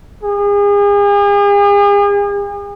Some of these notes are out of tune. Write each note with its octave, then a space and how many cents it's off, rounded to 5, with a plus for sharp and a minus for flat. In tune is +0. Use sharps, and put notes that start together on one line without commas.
G#4 -40